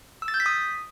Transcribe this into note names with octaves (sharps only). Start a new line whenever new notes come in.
E6
A6
G6
B6
D#6